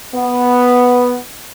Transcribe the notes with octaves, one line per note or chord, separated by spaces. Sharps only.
B3